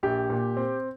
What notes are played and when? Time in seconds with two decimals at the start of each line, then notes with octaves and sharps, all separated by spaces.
0.03 A#1 G4
0.30 A#2
0.57 C4